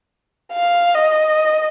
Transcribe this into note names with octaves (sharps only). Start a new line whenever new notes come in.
F5
D#5